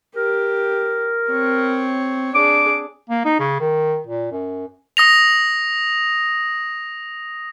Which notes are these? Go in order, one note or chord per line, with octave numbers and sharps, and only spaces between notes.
G4 A#4
C4 C#5
D4 G#4 D6
A#3
D#4
C#3
D#3
A#2
F#2
D#6 A#6 F7